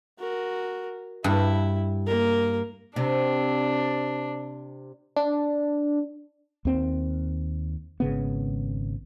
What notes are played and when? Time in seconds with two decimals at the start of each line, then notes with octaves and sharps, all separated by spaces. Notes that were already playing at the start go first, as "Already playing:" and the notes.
0.19 F#4 A#4
1.24 G2 E4
2.06 A#3 A#4
2.96 C3 D4
5.16 D4
6.65 D#2 C4
8.00 G#1 C#3 B3